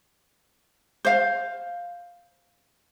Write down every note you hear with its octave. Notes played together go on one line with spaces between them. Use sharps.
C5 F5